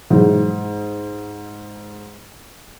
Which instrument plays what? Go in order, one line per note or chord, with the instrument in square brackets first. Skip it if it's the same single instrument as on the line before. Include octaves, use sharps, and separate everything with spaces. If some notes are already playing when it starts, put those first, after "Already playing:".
[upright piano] G#2 [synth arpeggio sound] B2 E3 F#3